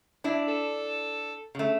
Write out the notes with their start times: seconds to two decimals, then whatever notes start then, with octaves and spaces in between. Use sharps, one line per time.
0.24 D4 E4 D5
0.48 A4
1.55 C#3 A3